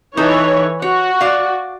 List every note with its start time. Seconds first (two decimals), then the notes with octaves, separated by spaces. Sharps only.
0.17 E3 D#4 A4 C#5
0.82 F#4 C#5
1.21 D5 F5